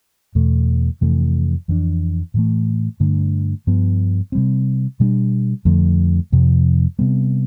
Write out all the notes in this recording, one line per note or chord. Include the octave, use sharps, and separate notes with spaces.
E2 B2 A3
F2 C3 E3 A3
F2 E3 B3 D4
A2 E3 A3
G2 D3 A3 D4
G2 F3 B3
C3 G3 C4
B2 G3 B3 D4
F2 D3 F3 A3
F2 C3 F3
C3 G3 B3